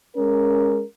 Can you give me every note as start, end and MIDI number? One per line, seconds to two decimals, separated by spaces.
0.17 0.84 56
0.17 0.84 61
0.17 0.84 70